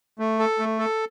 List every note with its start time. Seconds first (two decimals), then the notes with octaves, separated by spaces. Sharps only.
0.19 A3
0.39 A4
0.59 A3
0.79 A4